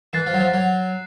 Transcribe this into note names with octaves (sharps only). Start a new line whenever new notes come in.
E3 F#6 A6 C7 E7
F3
F#3
F3
F#3